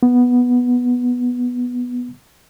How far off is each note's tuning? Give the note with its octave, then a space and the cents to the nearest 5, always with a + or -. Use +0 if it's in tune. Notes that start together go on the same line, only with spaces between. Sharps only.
B3 -5